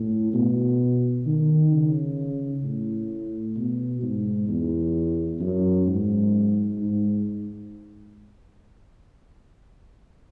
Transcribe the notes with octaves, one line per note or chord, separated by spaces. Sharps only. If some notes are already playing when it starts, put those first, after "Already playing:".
Already playing: A2
B2
D#3
C#3
A2
B2
G#2
E2
F#2
G#2
G#2